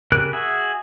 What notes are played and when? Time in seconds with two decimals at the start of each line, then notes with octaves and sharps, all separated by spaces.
0.12 C#3 G4 A#4 F#6
0.33 F#4 G#4 E5